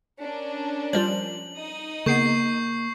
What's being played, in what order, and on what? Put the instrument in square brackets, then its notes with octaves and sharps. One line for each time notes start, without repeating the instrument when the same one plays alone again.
[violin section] C#4 D4 A#4
[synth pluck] F3 G3 F4 [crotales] F#7
[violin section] D#4 D#6
[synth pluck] C#3 B3 [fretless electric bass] A#3 [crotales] C#6 G6 C7